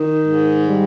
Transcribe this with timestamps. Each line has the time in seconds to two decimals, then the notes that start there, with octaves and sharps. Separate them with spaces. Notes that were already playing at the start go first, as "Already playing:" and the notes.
Already playing: D#3
0.26 G#2
0.65 G3